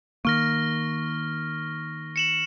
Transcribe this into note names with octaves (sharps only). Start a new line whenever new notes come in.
D#3 A#3 C#6 F6 A#6
C#7 E7 F#7